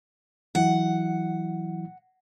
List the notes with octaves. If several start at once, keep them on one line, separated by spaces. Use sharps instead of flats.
E3 F#3 E4 F#5